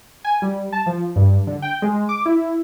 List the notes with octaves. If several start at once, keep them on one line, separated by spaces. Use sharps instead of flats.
G#5
G3
A5
F3
G2
D3
G5
G#3
D6
E4